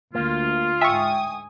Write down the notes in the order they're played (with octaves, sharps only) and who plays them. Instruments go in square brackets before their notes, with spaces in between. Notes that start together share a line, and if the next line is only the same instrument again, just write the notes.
[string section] D2 [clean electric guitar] A#3 [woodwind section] F4
[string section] G#2 G#5 D#6 [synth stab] E5 C#6 [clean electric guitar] G5